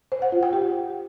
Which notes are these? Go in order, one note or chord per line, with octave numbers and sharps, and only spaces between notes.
C5
F#5
F4
G5
G4